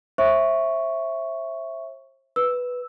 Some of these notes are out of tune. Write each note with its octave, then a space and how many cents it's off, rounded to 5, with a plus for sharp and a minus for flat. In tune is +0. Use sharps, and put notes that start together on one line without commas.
C5 +40 E5 +0 C#6 +0
B4 +0 E6 +0